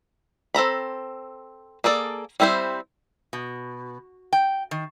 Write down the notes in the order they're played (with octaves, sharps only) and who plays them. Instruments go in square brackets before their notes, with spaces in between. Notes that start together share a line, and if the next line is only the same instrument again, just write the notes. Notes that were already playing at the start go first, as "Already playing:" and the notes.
[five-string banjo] C4 A4 A#5 B5
A#3 G#4 A4 D5
G3 C4 E4 B4 C5
[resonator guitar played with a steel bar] B2
G5
D#3